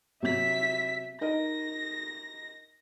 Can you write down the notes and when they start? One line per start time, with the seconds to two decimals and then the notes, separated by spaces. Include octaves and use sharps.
0.23 C3 F#3 E5 B6
1.21 D#4 A#4 D#5 A#6